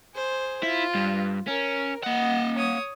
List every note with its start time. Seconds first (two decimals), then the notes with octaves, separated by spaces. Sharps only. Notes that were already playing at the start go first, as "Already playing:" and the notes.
0.14 G#4 C5
0.63 E4 F4
0.95 G2
1.47 C#4 A#4
2.03 A#3 D#5 F#5
2.56 C#5 D#6